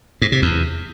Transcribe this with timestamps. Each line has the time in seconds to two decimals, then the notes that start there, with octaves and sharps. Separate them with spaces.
0.22 G#2
0.32 C3
0.42 E2